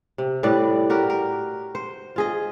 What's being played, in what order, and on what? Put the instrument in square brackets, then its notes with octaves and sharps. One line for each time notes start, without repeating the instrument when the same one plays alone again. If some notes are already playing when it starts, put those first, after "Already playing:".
[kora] C3
A2 G3 B4 D5
F#4 G4 A#4
A#4
C5
F4 G#4 D#5